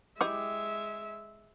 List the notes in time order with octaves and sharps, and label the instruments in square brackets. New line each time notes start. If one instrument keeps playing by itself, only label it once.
[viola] G#3 E5 [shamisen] E4 G4 D#5 [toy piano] D6